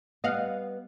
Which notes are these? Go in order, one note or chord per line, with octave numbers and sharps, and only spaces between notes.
G3 B3 D#5 F5 F#5